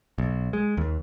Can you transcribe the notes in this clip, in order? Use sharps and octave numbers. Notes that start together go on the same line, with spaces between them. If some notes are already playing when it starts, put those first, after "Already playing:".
B1
G#3
D#2